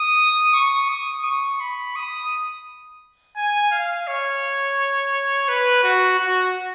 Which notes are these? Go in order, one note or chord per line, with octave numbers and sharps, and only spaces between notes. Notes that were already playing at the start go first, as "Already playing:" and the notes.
Already playing: D#6
C#6
D#6
C#6
B5
D#6
G#5
F5
C#5
B4
F#4
F#4